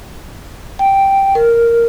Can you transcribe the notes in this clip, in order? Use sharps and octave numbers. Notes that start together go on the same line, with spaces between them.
G5
A#4